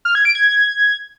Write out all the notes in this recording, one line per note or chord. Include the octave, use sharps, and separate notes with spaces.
F6
G#6
D7
G#6